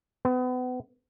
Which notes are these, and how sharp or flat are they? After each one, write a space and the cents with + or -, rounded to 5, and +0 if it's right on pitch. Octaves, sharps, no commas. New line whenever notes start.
B3 +35